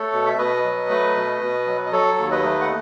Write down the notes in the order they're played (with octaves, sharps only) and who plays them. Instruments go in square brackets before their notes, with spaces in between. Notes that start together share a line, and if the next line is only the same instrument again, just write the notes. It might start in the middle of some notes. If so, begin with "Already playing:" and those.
Already playing: [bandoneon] A3 A4 C#5
B2
E5
B2 B4 D#5
F#3
A3
B2
B2
F#3
D#5
F#3 A4 C#5
D#2
B4 D#5
A3
F#5